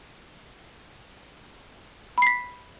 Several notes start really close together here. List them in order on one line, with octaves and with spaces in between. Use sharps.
B5 C7 B6